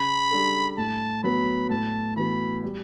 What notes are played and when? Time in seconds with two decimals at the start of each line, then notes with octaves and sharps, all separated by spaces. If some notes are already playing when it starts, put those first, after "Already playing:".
Already playing: C#3 B5
0.31 G3 D4 A4
0.77 A2 A5
1.24 F#3 B3 B5
1.69 A2 A5
2.16 E3 B3 F#4 B5
2.62 G3